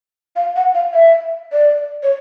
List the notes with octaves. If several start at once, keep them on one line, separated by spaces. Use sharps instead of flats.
F5
F#5
F5
E5
D5
C#5